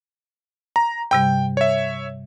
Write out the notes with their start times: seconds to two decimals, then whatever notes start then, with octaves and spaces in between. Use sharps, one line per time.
0.76 A#5
1.11 G2 C3 G3 G5
1.57 C#5 E5